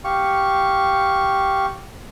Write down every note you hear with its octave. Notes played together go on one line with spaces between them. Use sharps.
G4 F5 C#6